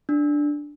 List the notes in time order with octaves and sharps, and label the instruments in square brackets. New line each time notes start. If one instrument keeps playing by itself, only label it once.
[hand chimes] D4